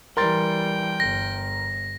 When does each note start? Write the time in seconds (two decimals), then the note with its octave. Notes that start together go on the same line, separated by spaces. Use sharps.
0.17 E3 G3 A#4 G5 C6 A6
1.00 G1 A#6